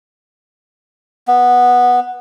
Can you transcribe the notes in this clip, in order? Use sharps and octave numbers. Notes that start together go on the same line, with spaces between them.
B3